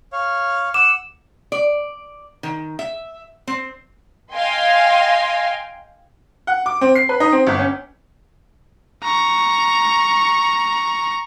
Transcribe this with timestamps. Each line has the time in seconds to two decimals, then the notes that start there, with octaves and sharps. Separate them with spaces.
0.12 C#5 F5
0.74 F#5 D6 E6 E7
1.52 D5
2.43 D#3
2.79 E5
3.47 C4
4.34 D#5 F5 G5 G#5 C6
6.47 F#5
6.66 D6
6.81 C4
6.95 C7
7.09 B4
7.20 D#4
7.32 C4
7.47 G1
7.59 C#4
9.03 A#5 C#6